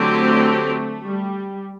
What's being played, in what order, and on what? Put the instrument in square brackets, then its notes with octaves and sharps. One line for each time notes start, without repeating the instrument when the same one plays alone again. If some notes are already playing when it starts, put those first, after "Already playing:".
Already playing: [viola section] D3 F#3 C4 G4 [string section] A3
[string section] G3